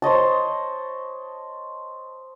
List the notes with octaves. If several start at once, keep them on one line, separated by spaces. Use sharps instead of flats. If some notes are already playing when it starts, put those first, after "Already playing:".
C5 C#5 D#5 A5